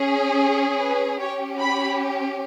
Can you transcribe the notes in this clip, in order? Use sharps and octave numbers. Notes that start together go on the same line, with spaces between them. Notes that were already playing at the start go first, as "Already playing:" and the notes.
Already playing: C#4 G#4
B4
C#4 G4 C#5
B5